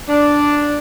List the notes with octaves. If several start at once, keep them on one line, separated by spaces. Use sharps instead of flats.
D4